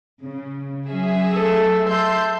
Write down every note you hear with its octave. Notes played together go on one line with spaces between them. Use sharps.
C#3
F#3 C#4 G#4 E5
A3 A4
E5 A5 C6 G6